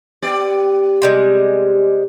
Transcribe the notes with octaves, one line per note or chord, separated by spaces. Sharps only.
B3 G4 D5
C3 G3 G#3